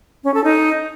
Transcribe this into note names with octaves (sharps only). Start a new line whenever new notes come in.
C#4
A4
D#4